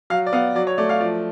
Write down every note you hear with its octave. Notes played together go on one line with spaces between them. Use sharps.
F#3 F5
D5
B3 F5
F#3 D5
C#5
A3 D5
F5
F3 D5